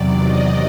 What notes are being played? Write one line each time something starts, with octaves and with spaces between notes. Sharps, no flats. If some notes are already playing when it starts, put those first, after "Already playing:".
Already playing: E2 C3 D#3 F#3 D5
D#5